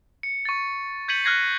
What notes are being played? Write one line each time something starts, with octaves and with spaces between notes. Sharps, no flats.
C#7
C#6 A6
G6 G#6 B6 C#7 D#7 F#7
F6 F#6 G#6 A#6 C7